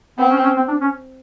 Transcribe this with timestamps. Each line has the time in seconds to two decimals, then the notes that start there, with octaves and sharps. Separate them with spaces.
0.18 B3 C4
0.30 C#4
0.43 C#4
0.56 C4
0.68 D4
0.81 C#4